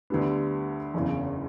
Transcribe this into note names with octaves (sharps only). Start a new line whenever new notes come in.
D2 D3 G3 B3 D4
F#1 E2 C#3